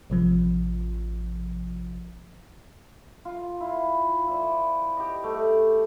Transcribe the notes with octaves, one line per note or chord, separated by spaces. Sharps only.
A1 C3 F3
F4
E4 F4
E4 C5 D5
G4 D#5
A3 B4